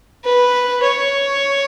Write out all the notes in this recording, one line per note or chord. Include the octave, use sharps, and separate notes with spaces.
B4
C#5